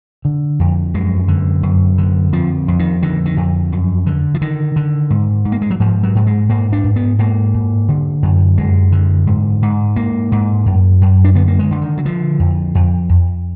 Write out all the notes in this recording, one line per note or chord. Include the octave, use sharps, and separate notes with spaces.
D3
F2
F#2 G#3
D3
F#2
D3
F2 F3
F2
D#3
D3 D#3
D#3
F2
F#2
D3
F3
D3 D#3
D3
G#2
G#2
A#3
G#3
F#3
G#2 F3
F#3
G#2
G#3
G#2 A#3
D4
G#2
B3
G#2 A#3
G#2
D3
F#2
F#2 G#3
D3
G#2
G#2
G#2 A#3
G#2
F#2
F#2
D4
D3 B3
A#3
G#3
D3
D#3
F#3
D3 F3
F2
F2
F2